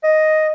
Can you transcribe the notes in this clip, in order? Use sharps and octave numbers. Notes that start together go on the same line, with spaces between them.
D#5